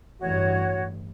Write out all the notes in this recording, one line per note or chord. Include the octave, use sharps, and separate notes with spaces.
A1 G2 F#4 C#5